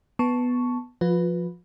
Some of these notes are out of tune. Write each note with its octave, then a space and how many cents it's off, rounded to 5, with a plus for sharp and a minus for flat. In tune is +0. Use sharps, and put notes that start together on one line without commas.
B3 +0 A5 +0 C#6 +5
F3 +0 F4 +40 B4 +0